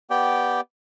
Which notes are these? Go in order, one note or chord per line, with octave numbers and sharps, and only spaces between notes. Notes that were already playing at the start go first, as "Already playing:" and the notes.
B3 G4 D5 G5